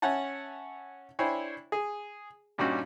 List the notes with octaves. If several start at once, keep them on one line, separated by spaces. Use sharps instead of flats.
C#4 C#5 E5 F#5 G#5 A5
D4 E4 C5 C#5 G5 G#5
G#4
G2 A#2 G3 C#4 D#4 F#4